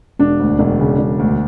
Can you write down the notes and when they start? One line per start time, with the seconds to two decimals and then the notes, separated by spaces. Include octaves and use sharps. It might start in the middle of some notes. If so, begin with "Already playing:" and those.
0.19 E1 D4
0.40 D2
0.59 E1
0.79 C#3
0.99 E1
1.19 D2